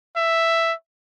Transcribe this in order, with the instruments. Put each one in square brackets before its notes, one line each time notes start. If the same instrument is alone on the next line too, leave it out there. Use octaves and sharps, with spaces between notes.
[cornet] E5